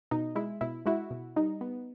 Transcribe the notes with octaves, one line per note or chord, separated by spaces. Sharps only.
B2 D#4
G#3 E4
B2 E4
G#3 E4 F#4
B2
G3 D#4
B3